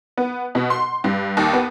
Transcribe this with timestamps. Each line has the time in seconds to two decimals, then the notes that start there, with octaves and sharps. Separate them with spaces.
0.17 B3
0.55 B2
0.70 C6
1.04 G2
1.37 D#2
1.53 B3